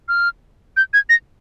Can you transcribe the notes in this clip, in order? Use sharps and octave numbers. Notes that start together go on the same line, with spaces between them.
F6
G6
G#6
A#6